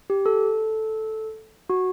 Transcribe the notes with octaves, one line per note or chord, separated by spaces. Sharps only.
G4
A4
F#4